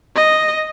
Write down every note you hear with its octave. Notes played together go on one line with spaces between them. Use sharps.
D#5